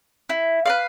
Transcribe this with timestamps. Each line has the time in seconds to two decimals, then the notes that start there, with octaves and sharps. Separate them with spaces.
0.29 E4
0.66 B4 D5 F5